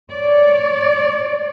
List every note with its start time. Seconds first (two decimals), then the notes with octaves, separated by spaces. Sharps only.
0.11 C#5 D5